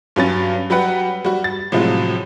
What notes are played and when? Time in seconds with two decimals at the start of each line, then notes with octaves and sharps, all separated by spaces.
0.16 G2 F#3 C#4 A6
0.70 F#3 G3 G4 B4 F#5
1.25 G3 F#4
1.44 A6
1.72 A2 C3 F3 F#3 G#3